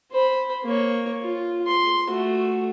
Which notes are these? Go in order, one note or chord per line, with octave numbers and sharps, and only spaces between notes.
C5 B5
A#3 C#5
F4
C6
A3 F#4